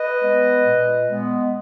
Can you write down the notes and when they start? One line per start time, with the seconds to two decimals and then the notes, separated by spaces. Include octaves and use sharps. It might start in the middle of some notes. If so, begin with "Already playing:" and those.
Already playing: B4 D#5
0.21 G#3 B3
0.64 A#2
1.08 G#3 B3